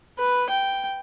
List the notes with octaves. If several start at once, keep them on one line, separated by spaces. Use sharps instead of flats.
B4
G5